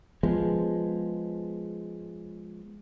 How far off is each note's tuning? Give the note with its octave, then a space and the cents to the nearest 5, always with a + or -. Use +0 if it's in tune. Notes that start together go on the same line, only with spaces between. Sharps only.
F3 +0 G#3 +0 B3 +0